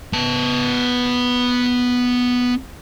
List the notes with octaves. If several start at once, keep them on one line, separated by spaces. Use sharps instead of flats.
B3 A5